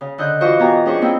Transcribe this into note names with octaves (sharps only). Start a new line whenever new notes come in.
C#3
D3 D#5 F#6 G6
E3 F4 F#4 C5 D#5 C#6
B2 G4 G#5 A#5
C#4 D4 G#4 C5 G#5 C#6
A#3 C4 E4 D#5 G5